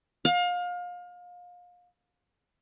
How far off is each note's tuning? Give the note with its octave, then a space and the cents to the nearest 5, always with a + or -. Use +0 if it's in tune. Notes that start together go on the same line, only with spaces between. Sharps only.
F5 +30